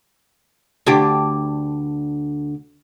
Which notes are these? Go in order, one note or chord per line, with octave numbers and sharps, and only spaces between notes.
D2 D4 G4